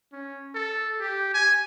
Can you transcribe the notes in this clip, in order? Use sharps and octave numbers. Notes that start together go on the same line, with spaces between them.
C#4
A4
G4
G#5